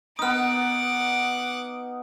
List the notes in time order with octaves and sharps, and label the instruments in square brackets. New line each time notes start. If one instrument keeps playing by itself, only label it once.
[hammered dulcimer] B3 D#4 [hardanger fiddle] F#5 D6 [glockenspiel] D#6 F6